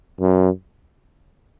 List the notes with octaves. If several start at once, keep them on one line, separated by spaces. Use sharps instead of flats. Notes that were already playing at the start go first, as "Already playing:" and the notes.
F#2